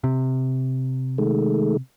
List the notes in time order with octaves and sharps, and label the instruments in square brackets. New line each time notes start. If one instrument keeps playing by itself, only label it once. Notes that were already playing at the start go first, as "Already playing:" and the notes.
[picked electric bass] C3
[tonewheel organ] D#3 G#3 A3